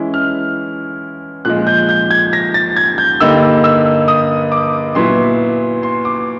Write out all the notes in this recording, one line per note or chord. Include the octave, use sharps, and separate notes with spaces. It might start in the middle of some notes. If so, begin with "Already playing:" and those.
Already playing: E3 G#3 C#4 E4
F6
A#2 F3 G#3 F#6
G6
G6
G#6
A#6
A6
G#6
G6
G2 D3 G3 A#3 D#4 E6
E6
D#6
D6
A#2 F#3 B3 E4 C6
C6
D6